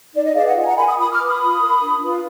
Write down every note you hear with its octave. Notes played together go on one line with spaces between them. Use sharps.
D#4 D5
D#5
G#4 B4 D5 F5
D#5 F#5
F4
G#5
F#5 A#5
A#4 G#5 B5
B5 D#6
F4 B5 D#6
D6 F6
B4
B5 D#6
F4
A#4
D4
F4 B4